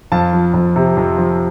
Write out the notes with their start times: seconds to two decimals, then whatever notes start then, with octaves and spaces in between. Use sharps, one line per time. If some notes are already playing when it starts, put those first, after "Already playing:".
0.12 F2 F5 A5
0.33 F3
0.54 F2
0.76 C3
0.97 F2
1.18 F3